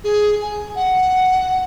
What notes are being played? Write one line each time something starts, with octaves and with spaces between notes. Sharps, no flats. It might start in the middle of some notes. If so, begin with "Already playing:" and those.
G#4
G#5
F#5